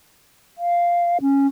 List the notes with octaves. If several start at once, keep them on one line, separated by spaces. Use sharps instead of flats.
F5
C#4